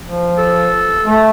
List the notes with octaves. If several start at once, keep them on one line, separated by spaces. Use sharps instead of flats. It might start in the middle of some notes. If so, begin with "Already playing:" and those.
F3
A4
A3